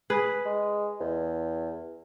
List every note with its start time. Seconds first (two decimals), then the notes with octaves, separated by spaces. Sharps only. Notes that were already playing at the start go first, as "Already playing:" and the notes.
0.10 G#4 B4
0.45 G#3
1.00 E2